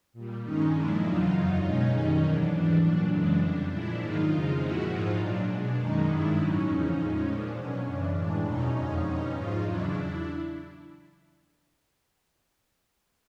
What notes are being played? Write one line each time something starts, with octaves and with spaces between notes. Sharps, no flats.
A#2 G3
G2 D#3 G#3 C#4 D#4
A#2 F3 G#3 D4 E4
E2 C#3 F#3 D#4 F4
F#2 D3 F#3
B2 G#3 C#4 D#4
F#2 D#3 G3
E2 B2 F#3 D4
G#2 E3 G3 D4
A#2 F#3
F#2 C#3 E3 G#3 D4
F2 D3 G3
A#2 F3 G#3 D4 E4
G#2 D#3 F#3 D#4 F4
F2 C#3 F3 G#3
A#2 F3 G#3 E4 F#4
G#2 F3 G#3 D#4 F4
A#2 F#3 D4
B2 G#3 D4
F#2 D#3 G#3 C#4 D#4
G2 D#3 G#3 D4 E4
A2 F#3 C#4 D#4
E2 C#3 F3
A2 F3 G#3
A#2 F3 G#3 D4
B2 F#3 C#4
F#2 C#3 E3 D4
A2 E3 G#3 D4
E2 B2 F#3 C#4 D#4
F2 D3 F3 G#3 C#4 D#4
B2 G3
G#2 F3 G#3 D#4 F4
E2 C#3 F#3 D4 E4